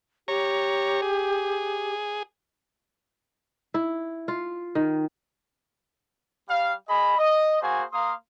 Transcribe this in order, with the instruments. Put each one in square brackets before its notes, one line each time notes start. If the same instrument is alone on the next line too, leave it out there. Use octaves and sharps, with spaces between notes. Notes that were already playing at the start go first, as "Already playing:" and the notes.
[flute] G4 [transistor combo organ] C#5 A#5
[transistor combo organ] G#4
[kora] E4
F4
D#3
[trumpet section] G3 F5
G#4 D#5 B5
D#5
A#3 F#4 G#4 C5 G#5
A#3 A#4 F5 C6 D#6